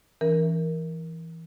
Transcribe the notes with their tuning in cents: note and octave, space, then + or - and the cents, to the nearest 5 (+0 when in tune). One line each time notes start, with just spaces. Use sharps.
E3 +0 C#4 +0 A#4 +5